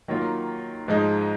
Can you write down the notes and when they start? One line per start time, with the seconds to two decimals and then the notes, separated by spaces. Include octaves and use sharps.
0.08 D#3 F#3 A#3 F4
0.88 G#2 F3 G#3 D#4